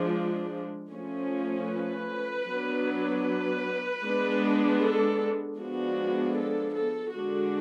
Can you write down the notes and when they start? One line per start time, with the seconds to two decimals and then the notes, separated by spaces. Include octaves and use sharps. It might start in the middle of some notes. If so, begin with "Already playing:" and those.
Already playing: F3 G#3 D4
0.92 F3 A3 C#4
1.68 B4
2.47 F#3 B3 D4
3.24 B4
4.02 G#3 B3 D4
4.80 A4
5.57 F3 G#3 B3 D4 F#4
6.35 A4
6.74 A4
7.13 D3 G#3 D4 F#4